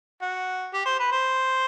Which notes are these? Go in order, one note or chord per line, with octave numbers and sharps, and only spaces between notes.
F#4
G4
C5
B4
C5